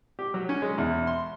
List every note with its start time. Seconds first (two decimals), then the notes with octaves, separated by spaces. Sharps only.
0.19 G4
0.34 F#3
0.49 C#4
0.62 G#3
0.78 E2
1.07 C6